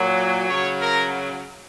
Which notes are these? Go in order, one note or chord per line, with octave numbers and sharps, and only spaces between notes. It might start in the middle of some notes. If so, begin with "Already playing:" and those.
Already playing: A#2 F#3
C#3 F#3 C#5
A#4